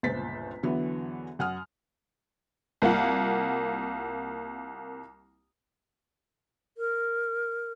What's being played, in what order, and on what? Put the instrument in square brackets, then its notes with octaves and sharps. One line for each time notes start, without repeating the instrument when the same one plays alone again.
[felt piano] G1 C#2 A#2 C5 A6 B6
E2 D3 E3 F#3 B3
F#2 F#5 D#6 F6
[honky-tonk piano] C2 A#3 F4 F#5
[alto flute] A#4